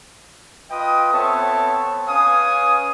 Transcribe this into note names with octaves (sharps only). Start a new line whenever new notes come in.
F4 B4 D#5 G5 D#6
B3 C4 A4 C#5 E5 A5
C#4 B4 F5 G#5 D#6